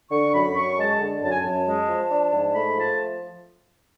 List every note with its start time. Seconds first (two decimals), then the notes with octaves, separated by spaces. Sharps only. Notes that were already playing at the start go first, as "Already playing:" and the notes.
0.11 D3 C#6
0.33 F#2 B5
0.55 F#2 C#6
0.78 G#3 A5
1.00 D3
1.22 F#2 A5
1.30 G#5
1.38 A5
1.44 F#2
1.66 G#3
1.89 F3
2.10 D4
2.33 G#2
2.54 A3 B5
2.77 F3 A5